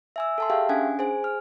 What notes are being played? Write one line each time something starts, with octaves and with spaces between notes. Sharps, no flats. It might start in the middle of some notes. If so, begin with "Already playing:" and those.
E5 G#5 E6
A4 A5 C6
G4 G#4 E5 F5 G5
C#4 D4 F#5 G#5 G#6
G#4 C5 G#5
F6